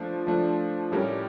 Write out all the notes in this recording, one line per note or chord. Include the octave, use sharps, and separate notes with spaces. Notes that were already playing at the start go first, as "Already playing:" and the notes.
Already playing: F3 A3 D4
F3 A3 D4
A2 G3 C#4 G4 A#4